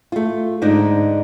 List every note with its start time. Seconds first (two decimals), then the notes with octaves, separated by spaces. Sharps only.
0.12 A3 F4
0.62 G#2 D3 D4 D#4